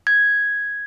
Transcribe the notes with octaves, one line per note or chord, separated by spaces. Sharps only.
G#6